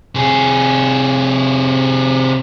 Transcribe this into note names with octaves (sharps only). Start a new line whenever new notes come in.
C3 G#4